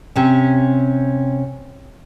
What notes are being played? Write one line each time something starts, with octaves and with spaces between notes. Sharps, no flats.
C3 C#4